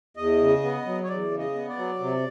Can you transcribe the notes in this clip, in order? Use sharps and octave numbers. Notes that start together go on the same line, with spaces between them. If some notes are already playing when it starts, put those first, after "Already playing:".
E2 D#5
C#3
B3
F#3
C#5
E2 D5
C#3
D#5
B3
D5
F#3
C3